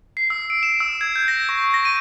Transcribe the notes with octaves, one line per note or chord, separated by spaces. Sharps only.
C7
E6
D7
E7
E6
G#6
G6
A#6
C#6
A#6
D#7